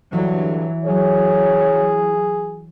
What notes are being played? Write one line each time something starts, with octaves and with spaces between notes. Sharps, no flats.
G2 D3 E3 F#3
F#3 G#4 C#5